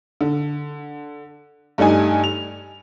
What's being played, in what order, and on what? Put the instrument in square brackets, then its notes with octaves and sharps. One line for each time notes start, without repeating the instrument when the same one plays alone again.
[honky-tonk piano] D3
G2 A3 D4 D#4 G#5
F7